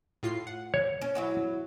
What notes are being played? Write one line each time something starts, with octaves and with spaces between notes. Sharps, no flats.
A2 F4 C7
F#5
C#5
C#4
F#3 E4 F#4